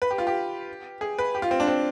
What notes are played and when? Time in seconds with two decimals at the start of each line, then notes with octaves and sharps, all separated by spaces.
0.02 B4
0.11 G4
0.18 F4
0.27 G4
1.01 G#4
1.18 B4
1.35 G4
1.42 F4
1.51 C4
1.60 D4
1.67 C4